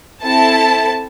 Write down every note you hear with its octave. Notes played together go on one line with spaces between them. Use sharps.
C4 E4 A4 A5